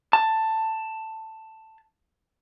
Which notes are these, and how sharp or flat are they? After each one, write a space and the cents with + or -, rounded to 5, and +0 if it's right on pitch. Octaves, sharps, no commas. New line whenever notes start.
A5 +10